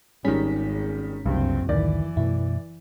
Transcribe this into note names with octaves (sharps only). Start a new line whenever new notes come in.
G#1 D#3 G3 C#4 G#4 B6
F#1 C2 G2 C4
A1 D2 D#3 E3 D5
F#2 B2 A3 E4